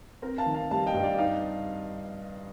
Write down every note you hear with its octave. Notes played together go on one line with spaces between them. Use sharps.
C4 A#4
F5 A5
D#3
F5 A5
G3 F5 A5
D#5 G5
G2
D5 F5
D#4 F5